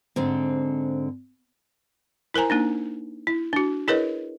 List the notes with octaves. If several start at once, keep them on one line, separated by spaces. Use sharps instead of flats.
G#2 D3 C4
E4 A#4 C5 G#5 A#5
A#3 D4 D#4
E4
D4 F#4
E4 G#4 A#4 B4 C#5 D#5